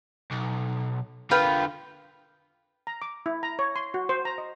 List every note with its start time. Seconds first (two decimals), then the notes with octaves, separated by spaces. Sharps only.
0.32 B1
1.31 D3 A#3 F4 B4 G5
2.87 A#5
3.02 D6
3.26 E4
3.43 A#5
3.59 C#5
3.76 C6
3.94 F#4
4.09 C5
4.25 A#5
4.38 D#5